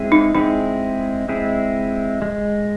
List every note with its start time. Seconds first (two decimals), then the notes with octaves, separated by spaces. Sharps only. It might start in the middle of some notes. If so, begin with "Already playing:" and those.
Already playing: G#3 C4 E4 G#4
0.12 D#4
0.35 G#3 C4 D#4 E4 G#4
1.29 G#3 C4 E4 G#4
2.22 G#3